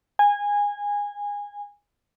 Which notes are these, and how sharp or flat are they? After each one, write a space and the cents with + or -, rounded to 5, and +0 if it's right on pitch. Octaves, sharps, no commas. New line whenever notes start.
G#5 -20